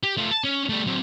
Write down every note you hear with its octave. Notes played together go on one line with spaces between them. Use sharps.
G4
A3 F4
A5
C#4
G3 A3
F#3 C4